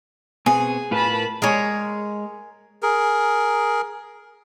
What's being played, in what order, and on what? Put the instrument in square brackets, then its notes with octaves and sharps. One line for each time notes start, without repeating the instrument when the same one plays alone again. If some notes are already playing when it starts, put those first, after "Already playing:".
[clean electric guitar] B2 B3 C4 [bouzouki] G#4
[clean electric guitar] A2 F4 B4 [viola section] A#4 A5 B5
[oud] G#3 C#5 [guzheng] G#4 A#4
[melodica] G#4 A#4